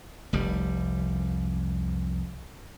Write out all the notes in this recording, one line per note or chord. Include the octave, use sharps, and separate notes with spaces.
F1 C2 G3